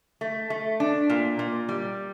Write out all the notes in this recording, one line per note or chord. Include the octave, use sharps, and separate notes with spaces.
A3
A3
D4
A#2
A#2
G3